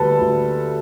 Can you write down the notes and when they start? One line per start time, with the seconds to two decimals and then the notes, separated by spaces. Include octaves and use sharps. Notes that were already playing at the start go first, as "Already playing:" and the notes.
Already playing: D2 G3 A4 B4
0.21 D2